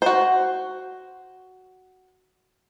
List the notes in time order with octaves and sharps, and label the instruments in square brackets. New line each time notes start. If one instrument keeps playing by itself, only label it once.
[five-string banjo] F#4 C5